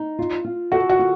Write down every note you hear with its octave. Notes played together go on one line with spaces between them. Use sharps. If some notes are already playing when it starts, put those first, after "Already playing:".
Already playing: D#4
F4
F4
F#4 A4
F#4
F4